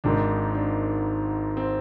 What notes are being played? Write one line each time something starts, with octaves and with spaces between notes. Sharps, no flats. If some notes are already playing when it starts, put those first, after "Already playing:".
G#1 G#2 D#3 D4
D4
C4